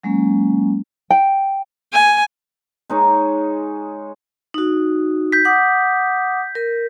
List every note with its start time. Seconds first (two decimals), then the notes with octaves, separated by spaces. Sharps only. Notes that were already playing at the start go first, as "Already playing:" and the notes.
0.03 F#3 G#3 A#3 C#4
1.10 G5
1.93 G#5
2.90 G#3 D#4 C#5
4.54 D#4 F#4
5.32 G6 B6
5.45 F#5 D6 D#6
6.55 A#4